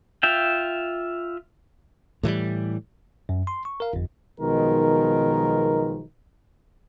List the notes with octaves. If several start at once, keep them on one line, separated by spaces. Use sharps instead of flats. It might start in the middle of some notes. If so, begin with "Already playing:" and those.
F4 E5 G5
A2 E3 F3 G3
F#2
C6
C#6
A#4 F5
G1 F2
B1 B2 D#3 F3 G#3 A#4